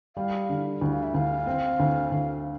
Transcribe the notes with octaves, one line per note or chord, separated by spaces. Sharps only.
G3 F5
D3
D2
F5
E5
D2 F5
C4
D2
D2